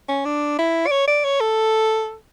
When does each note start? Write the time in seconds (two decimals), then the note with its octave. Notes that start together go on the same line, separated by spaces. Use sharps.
0.08 C#4
0.25 D4
0.58 E4
0.87 D5
0.91 C#5
1.07 D5
1.24 C#5
1.40 A4